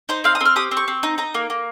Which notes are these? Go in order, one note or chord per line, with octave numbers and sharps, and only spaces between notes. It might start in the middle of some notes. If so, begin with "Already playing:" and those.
D#4 C5
C4 F5
D#6
C4 F6
G4 D#6
C4
C#6
C4
D#4
D#4 A#5
A#3
A#3